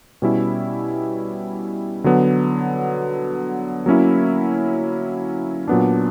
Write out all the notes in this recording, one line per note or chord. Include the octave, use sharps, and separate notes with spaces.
B2 G3 C#4 E4
D3 F#3 B3
F#3 A#3 C#4 E4
A#2 F#3 B3 D4